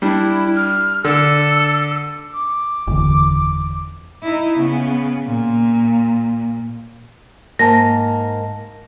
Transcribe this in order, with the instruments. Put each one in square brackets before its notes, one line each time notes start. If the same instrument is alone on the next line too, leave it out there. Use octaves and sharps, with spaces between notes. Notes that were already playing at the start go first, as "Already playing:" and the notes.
[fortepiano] G3 D4 [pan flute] E4
[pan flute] F6
[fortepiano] D3 [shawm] A4 [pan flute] E6
[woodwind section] D6
[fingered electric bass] F#1 E2 D3
[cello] D#4 E4
C#3 B3
A#2
[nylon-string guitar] G#2 A#3 G#5 [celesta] A5 A#6